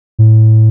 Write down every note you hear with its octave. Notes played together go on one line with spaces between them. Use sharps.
A2